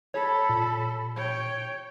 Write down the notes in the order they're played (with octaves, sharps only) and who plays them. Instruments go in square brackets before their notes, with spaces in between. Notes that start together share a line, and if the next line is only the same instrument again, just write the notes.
[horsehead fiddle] A4 B5 [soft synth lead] C#5
[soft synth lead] A#2
[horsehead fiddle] C#5 G5